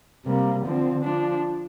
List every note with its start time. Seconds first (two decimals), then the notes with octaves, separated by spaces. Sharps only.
0.24 C3 G3 A#3
0.64 D3 F3 C4
1.03 F3 D4